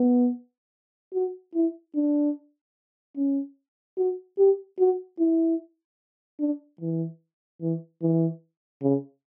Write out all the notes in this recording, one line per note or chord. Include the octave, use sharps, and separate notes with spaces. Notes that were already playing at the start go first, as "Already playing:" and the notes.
Already playing: B3
F#4
E4
D4
C#4
F#4
G4
F#4
E4
D4
E3
E3
E3
C#3